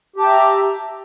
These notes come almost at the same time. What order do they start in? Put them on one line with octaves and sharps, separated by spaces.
G4 A5 G5 E5 A#5